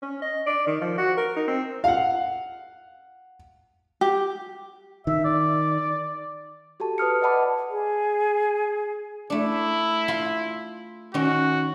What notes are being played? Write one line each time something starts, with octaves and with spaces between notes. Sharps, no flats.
C#4
D#5
D5
D#3
F3
F#4
A#4
D#4
C4
F5 F#5
G4
D#3 E5
D5
F#4 G4 A4 A5
B4 D#6 F6 C#7
D5 D#5 F#5 A5 B5 D6
G#4
A3 D4 E4
F4 B5 C6
D#3 C#4 F#4